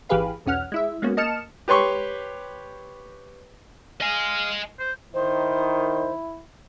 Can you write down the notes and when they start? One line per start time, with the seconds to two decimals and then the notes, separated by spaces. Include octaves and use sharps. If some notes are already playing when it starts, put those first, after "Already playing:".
0.09 G#1 E3 G4 G#4 B4 F5
0.46 B1 E2 C#4 F#5 F6
0.72 G#3 E4 E5
1.02 G#3 A#3 B3 C#4 F#4
1.17 A#3 D#5 A5 F6 C#7 E7
1.68 G4 B4 C#5 C6 C#6
4.01 D#5 F5 G#5
4.79 C5
5.14 D#3 E4 C5